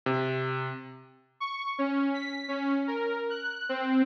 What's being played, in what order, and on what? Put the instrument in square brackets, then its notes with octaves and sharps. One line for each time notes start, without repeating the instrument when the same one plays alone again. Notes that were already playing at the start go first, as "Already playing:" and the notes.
[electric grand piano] C3
[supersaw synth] C#6
C#4
B6
C#4
A#4
F#6
C4